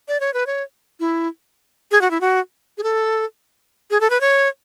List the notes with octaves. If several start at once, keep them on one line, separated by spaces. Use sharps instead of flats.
D5
C#5
B4
C#5
E4
G#4
F#4
E4
F#4
G#4
A4
G#4
A4
B4
C#5